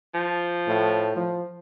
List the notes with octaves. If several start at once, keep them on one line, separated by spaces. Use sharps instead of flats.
F3
A2
F3